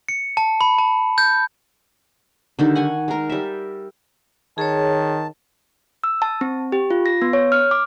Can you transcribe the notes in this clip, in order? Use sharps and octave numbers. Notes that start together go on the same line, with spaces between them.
C#7
A5
B5
A5
G6
D3 D#3 G3
F#5 G#5 C#6
G#3 A#4
G3 E5
D#3 G#4 C#5 A5
E6
A5
C4
G4
F4
A#6
B3
C#5
F6
D6